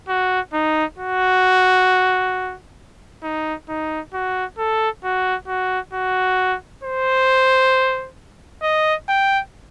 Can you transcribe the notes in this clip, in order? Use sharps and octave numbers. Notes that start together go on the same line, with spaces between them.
F#4
D#4
F#4
D#4
D#4
F#4
A4
F#4
F#4
F#4
C5
D#5
G5